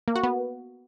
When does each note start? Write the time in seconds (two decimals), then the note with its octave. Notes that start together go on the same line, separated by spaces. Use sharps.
0.08 A#3
0.16 F#4
0.24 B3